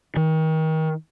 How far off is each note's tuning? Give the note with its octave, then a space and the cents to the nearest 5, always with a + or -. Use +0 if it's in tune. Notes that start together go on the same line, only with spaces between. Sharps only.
D#3 +30